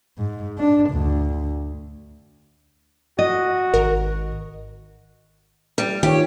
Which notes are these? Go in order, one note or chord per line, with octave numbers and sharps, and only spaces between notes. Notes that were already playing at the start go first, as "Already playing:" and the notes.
G#2
D4
D2
F#4 D#5
G#1 D#3 A#4
G3
D#3 F4 G4 C#5